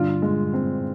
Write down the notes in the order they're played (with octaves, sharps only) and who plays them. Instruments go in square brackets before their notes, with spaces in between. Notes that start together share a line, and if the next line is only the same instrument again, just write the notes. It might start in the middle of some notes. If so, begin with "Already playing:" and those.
Already playing: [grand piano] G2 F4 [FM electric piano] D3 D4
[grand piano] G#3
C4